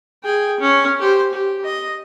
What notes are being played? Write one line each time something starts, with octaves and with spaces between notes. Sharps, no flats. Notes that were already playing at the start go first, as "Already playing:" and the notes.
G#4 G5
C#4
G4 C5
G4
D#5